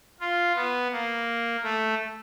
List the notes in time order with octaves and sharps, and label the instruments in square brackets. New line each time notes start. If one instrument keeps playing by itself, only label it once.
[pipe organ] F4
B3
A#3
A3